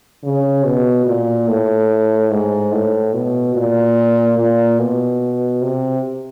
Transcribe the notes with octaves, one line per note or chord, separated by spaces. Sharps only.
C#3
B2
A#2
A2
G#2
A2
B2
A#2
A#2
B2
C3